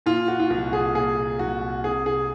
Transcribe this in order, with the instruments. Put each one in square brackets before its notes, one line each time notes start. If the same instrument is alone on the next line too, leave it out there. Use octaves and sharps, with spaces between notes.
[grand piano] A#2 F4
F#4
F4
C2 F#4
G#4
A#2 G#4
C2 F#4
C3 G#4
G#4